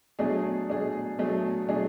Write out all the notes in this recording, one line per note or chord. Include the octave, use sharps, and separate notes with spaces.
B2 F#3 A3 D4 G#4
B2 F#3 A3 D4 G#4
B2 F#3 A3 D4 G#4
B2 F#3 A3 D4 G#4